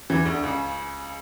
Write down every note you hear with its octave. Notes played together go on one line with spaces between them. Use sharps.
E2 E3
D2 D3
C#2 C#3